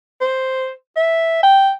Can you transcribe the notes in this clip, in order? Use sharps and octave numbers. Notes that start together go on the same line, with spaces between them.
C5
E5
G5